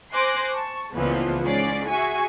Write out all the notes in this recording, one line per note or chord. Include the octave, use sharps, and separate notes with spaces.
C5 G#5 C6 D6 F#6 A#6
A5 C#6
C#2 A#2 E3 F3 B3
G#2 C#4 D5 C7
F#4 G#4 E5 G#5 C#6